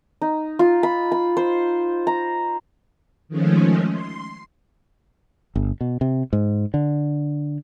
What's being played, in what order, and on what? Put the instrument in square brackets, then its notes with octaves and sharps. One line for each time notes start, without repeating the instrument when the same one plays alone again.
[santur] D#4
F4
B5
B5
C5
A#5
[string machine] D#3 F3 G#3 A3 C#4
C6
[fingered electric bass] G1
B2
C3
G#2
D3